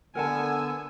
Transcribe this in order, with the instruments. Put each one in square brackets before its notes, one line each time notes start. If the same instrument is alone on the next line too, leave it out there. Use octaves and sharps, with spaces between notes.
[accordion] D3 B3 [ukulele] A#4 F#5 A5 [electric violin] G#5 E6